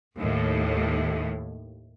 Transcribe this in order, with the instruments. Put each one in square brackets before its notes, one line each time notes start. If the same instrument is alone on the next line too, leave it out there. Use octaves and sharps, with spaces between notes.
[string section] D#2 A2